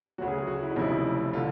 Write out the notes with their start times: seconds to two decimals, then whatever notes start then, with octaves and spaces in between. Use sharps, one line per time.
0.18 D2 C#3 F#3 F#4
0.28 G#4
0.38 G#4
0.47 F#4
0.62 E4
0.70 D#4
0.76 F1 F2 C#3 F3 E4
1.33 D3 F3 F4